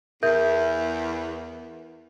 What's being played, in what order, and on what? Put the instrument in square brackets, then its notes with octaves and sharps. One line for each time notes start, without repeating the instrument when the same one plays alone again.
[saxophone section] E2 [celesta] A#4 E5 G6